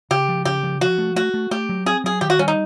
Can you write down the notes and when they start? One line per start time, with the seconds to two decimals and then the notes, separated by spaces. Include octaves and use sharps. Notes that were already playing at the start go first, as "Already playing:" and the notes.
0.11 C#3 G4
0.28 F3
0.45 C#3 G4
0.63 F3
0.81 F3 F#4
0.98 A3
1.16 A3 F#4
1.34 A3
1.51 A3 G4
1.69 F#3
1.86 C4 G#4
2.04 F#3 G#4
2.21 D#3 G4
2.30 F#4
2.39 G3 C#4
2.48 D#4